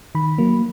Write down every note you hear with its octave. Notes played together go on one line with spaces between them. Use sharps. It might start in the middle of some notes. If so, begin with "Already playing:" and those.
D#3 B5
F#3 A#3